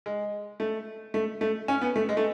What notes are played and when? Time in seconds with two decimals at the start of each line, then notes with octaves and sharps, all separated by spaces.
0.06 G#3
0.60 A3
1.14 A3
1.41 A3
1.68 C#4
1.81 B3
1.96 A3
2.09 G#3
2.17 A3